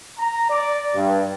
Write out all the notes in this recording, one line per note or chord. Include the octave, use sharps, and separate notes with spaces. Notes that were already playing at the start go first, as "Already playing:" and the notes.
A#5
D5
G2